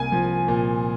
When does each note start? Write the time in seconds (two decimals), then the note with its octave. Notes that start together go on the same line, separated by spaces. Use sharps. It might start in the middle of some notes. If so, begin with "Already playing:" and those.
Already playing: C2 A#3 G#5
0.12 F3
0.48 A#2